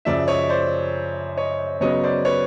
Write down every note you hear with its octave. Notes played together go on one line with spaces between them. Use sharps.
F#2 C#3 F3 D5 E5
C#5 D#5
C5 D5
C#5 D#5
C#3 F#3 B3 C#5 D#5
C5 D5
B4 C#5